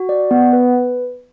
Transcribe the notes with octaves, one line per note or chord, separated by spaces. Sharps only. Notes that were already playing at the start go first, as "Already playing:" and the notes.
Already playing: F#4
D5
B3
B4